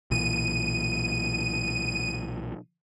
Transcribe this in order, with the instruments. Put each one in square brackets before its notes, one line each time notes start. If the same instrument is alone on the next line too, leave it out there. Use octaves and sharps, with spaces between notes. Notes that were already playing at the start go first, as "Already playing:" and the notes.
[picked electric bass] B1 A#2 E3 [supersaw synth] D#7